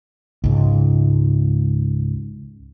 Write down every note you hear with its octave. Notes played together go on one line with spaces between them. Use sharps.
C#2 G#2